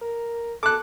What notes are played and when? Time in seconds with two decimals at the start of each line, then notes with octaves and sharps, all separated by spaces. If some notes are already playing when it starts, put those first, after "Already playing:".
0.02 A#4
0.63 A4 D6 F#6